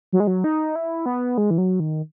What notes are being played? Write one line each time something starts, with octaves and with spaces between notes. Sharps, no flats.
F#3
G#3
F#3
D#4
E4
B3
G#3
E3
F#3
D#3